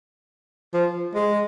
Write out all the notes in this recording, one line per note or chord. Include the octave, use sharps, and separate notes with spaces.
F3
G#3